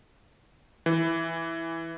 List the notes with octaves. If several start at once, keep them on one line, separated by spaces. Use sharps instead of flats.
E3